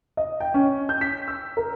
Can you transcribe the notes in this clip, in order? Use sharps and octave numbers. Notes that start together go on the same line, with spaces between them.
D#5
G5
C#4
G6
B6
E6
A#4